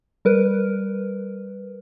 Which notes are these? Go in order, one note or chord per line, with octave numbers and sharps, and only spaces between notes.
G3 A#4 B4